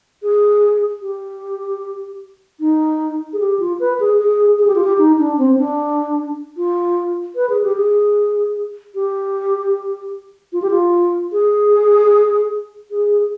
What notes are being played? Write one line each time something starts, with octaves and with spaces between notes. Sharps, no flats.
G#4
G4
D#4
G#4
G4
F4
B4
G#4
G#4
G#4
G4
F4
G4
D#4
D4
C4
D4
F4
B4
G#4
G4
G#4
G4
F4
G4
F4
G#4
G#4